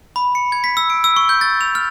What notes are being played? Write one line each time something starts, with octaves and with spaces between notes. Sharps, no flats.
B5
C#7
G#6
B6
E6
D7
E6
C#6
G6
A6
F7
F6